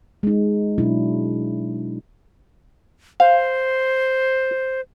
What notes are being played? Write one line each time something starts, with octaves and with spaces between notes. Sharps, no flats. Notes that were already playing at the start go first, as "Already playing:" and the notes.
G#3 D#4
B2 F#3 D4 E4
C5 F5